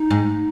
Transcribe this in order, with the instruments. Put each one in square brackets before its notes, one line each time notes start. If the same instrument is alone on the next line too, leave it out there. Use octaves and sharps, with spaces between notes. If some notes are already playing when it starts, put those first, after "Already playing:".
Already playing: [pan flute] D#4
[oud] G#2